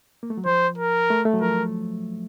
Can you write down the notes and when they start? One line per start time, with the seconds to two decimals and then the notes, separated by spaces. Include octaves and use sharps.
0.23 A#3
0.30 A3
0.37 F#3
0.46 F3 C5
0.78 A#4
1.10 A3
1.25 A3
1.34 F#3
1.41 F3 A#4